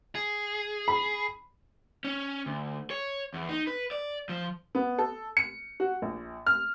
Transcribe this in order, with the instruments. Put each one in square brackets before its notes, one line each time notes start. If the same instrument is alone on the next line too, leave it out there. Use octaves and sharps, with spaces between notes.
[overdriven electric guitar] G#4
[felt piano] B5
[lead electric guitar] C#4
D2
C#5
E2
D#4
B4
D5
F3
[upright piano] B3
A4
C#7
F#4
A#1
F6